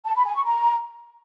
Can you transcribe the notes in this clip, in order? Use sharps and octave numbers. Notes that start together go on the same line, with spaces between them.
A5
B5
G#5
C#6
A#5